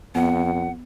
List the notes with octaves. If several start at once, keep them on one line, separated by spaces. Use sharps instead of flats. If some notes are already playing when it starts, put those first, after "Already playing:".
F2 B3 F#5